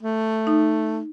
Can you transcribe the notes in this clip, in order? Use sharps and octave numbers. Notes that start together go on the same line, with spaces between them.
A3
D#4